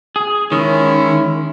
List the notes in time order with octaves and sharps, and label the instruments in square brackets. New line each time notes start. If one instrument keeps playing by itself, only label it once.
[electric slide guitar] G#4
[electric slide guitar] D#3 [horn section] G#3 C#4 E4